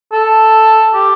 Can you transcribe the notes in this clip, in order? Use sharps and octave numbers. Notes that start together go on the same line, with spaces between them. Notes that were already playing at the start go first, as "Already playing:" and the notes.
A4
G4